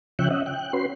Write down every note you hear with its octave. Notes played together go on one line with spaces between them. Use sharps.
C#3 F3 C#5 E5 G5 F#6
C#4 D#5 E5 F#5
G5 F#6
C#4 F#4 B4 C6